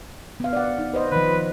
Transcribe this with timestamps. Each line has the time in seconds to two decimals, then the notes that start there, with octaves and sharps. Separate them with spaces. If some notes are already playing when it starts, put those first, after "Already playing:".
0.40 B3 F5
0.53 D5 F#5
0.78 D#4
0.94 B4 C5 D#5
1.12 D#3 F3 B4